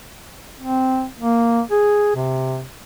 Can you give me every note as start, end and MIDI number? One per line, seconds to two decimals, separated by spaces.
0.60 1.07 60
1.19 1.62 58
1.71 2.12 68
2.15 2.64 48